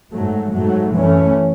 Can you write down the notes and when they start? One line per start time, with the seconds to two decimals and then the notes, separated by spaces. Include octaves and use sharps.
0.11 G#2 F#3 A3
0.53 G#2 F#3 A3
0.94 F#2 E3 A3 C#4